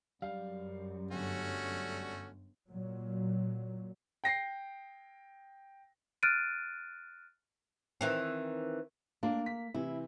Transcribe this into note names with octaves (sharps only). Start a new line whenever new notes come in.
F#2 G3 F5
G1 A3 C#4 F#4
A#2 F#3
G5 A#6 C7
F6 F#6 A6 D7 D#7
D#3 E3 C4
A#3 D4
B6
C3 E3 E4